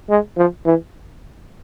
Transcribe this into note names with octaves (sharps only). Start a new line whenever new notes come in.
G#3
F3
E3